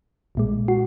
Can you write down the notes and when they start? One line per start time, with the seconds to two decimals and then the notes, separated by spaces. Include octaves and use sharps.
0.35 B1 A#2 G#3
0.68 F#4